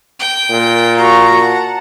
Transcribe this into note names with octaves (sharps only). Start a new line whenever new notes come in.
G5
A#2
F#4 F5 A#5 C#6
F#5 A5